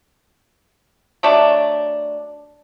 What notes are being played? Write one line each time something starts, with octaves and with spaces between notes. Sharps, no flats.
F#3 A3 D4